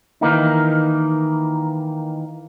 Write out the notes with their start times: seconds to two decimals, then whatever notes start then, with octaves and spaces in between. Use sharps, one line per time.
0.21 D#3 E3 A#3 D#4